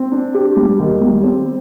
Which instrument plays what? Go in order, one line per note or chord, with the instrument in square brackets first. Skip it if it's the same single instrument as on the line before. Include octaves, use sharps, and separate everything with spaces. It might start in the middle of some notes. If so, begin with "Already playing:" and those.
Already playing: [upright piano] C4
D4
G4
G3
D#2
G3
C4